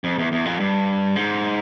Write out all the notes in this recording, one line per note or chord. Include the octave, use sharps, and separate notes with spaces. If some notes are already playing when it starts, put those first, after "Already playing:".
F2
E2
E2
F2
G2
G#2